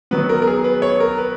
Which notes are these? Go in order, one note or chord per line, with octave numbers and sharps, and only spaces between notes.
D#3 F#3 B3 B4
A#4
A#4
G#4
B4
C#5
A#4
B4